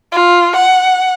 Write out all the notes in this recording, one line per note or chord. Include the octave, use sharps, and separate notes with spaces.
F4
F#5